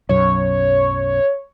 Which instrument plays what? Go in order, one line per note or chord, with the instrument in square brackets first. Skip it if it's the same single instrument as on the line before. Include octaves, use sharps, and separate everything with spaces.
[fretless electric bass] B1 F#2 [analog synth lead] C#5